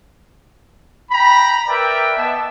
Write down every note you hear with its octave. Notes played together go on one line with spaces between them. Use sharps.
G5 A#5 B5
A#4 B4 D5 E5 G5
B3 D#5 E5 A5